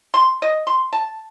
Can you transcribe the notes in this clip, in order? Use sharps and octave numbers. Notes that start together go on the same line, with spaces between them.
C6
D#5
C6
A5